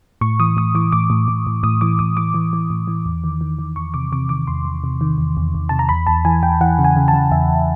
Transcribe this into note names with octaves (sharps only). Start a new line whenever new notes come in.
A2 C#6
E3 D#6
A2 D#6
E3 D6
A2 D6
A2
A2
A2
A2 D#6
E3 D6
A2 D#6
E3 D6
E3
E3
A2
E3
E2
D#3
D#3
D#3
E2 C#6
C3 D6
C3 D6
D#3 D6
E2 C6
E2
C3
D#3
E2
E2
E2
C3 A5
A#5
E2 B5
E2 A5
E3 G#5
E2 G5
E3 F#5
C#3
G#5
C#3
A5
C#3
E2 E5
E2